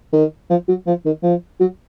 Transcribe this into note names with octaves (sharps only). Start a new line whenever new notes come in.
D#3
F3
F#3
F3
D#3
F3
F#3